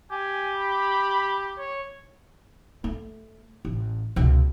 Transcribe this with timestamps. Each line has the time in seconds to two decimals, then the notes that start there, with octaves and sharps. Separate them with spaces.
0.12 G4 G#5
0.54 B5
1.58 C#5
2.84 A3
3.65 A1
4.16 C#2 B2